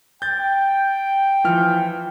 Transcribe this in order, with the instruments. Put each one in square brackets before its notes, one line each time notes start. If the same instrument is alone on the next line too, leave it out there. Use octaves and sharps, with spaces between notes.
[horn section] G5 [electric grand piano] G6 A6
[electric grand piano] E3 F3 F6